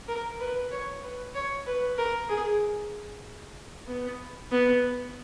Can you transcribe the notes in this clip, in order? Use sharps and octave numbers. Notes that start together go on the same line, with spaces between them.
A#4
B4
C#5
B4
C#5
B4
A#4
G#4
B3
B3